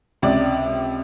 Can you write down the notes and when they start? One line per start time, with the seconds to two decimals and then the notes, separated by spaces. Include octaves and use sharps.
0.22 C#2 C3 D5